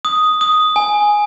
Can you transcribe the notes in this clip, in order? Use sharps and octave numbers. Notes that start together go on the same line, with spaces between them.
D#6
D#6
G#5